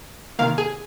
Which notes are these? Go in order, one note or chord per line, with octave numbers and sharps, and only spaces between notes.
C3 D#3 A#3 F5
G#4